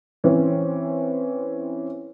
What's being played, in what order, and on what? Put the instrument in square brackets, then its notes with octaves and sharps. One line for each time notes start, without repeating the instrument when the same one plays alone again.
[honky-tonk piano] E3 C4 C#4